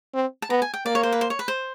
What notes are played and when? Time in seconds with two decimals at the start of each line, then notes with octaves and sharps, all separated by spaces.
0.14 C4
0.42 A5
0.50 B3 A#5
0.62 G#5
0.74 G5
0.86 A#3 D5
0.95 C#5
1.03 C5
1.12 B4
1.21 C5
1.30 C#5
1.39 B4
1.48 C5